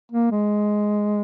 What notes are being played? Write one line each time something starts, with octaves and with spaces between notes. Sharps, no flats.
A#3
G#3